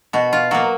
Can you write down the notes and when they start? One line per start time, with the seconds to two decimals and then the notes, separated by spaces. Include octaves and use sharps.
0.13 B2 F#4
0.33 F4
0.51 F#3 A#3 F#4